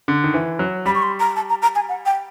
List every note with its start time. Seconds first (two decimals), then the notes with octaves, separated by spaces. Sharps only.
0.08 D3
0.24 D#3
0.34 E3
0.59 F#3
0.86 G3 B5
0.95 C#6
1.02 C6
1.20 A#5
1.36 A5
1.49 A#5
1.62 A#5
1.75 G#5
1.89 F#5
2.06 G5